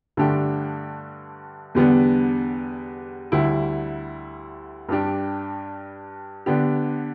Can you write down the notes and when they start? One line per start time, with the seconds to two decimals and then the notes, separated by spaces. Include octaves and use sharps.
0.17 G2 D3 A3 D4 G4
1.75 E2 D3 G3 B3 D4
3.32 D2 D3 G3 E4
4.89 G2 G3 D4 G4
6.46 D3 B3 D4 G4